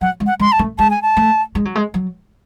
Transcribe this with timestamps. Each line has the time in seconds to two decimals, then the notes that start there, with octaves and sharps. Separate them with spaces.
0.01 F#3 F#5
0.20 G#3
0.26 F#5
0.39 G#3 C6
0.52 A5
0.59 A3
0.78 G#3 A5
0.90 G#5
1.02 A5
1.17 A3
1.55 G#3
1.65 F#3
1.75 G#3
1.94 F#3